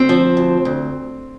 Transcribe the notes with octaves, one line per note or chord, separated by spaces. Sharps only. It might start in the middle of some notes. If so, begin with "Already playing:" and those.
Already playing: D2 C4
F3
D2
D2